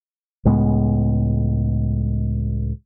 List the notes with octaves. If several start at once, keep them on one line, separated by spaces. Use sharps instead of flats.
C#2 A2 G#3 B3